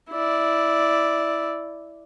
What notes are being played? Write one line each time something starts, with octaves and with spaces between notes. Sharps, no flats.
E4 D5